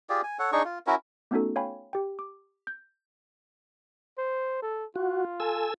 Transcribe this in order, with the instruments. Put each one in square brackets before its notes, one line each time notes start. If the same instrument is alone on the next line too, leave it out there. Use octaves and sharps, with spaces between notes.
[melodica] F4 G4 G#4 D5
G#5
A4 C#5 F#5
D4 D#4 G#4 C#6
F4
C#4 E4 F#4 A#4
[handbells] A3 B3 C#4 D#4 F#4 A4
C#5 F5 G5 G#5 B5
G4 G5
D6
G6
[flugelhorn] C5
A4
[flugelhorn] F4 [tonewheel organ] F#4
[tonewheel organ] A4 G#5 E6